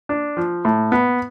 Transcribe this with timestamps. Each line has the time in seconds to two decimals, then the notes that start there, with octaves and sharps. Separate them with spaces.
0.09 D4
0.37 F3
0.65 A2
0.92 B3